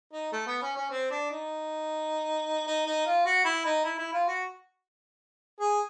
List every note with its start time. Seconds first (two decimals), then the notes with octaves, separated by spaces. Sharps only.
0.13 D#4
0.33 A3
0.47 B3
0.62 C#4
0.77 C#4
0.91 C4
1.11 D4
1.31 D#4
2.66 D#4
2.86 D#4
3.06 F4
3.26 F#4
3.45 E4
3.65 D#4
3.84 E4
3.98 E4
4.13 F4
4.28 F#4
5.60 G#4